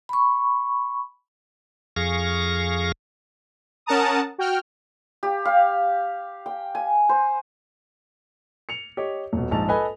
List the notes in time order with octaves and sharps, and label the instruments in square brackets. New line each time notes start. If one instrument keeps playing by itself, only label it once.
[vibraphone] B5 C#6
[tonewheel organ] F2 G#4 F5 C#6 A#6
[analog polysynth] C#4 A#4 F#5 A5 A#5 D#6
F#4 G5 F6
[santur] G4
F5
G5
G#5
C5
[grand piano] C#7 F7
G4 C#5 D#5
D#1 B2
A#1 G#2 D#4 A5 F7
A4 B4 D#5 G#5 B5